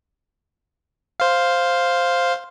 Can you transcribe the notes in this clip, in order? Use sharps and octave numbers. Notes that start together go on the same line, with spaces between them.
C5 F5